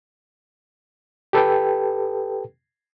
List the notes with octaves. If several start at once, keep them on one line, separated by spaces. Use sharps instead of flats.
G4 A4 B4 G5